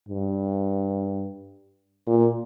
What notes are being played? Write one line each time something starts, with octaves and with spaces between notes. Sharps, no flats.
G2
A#2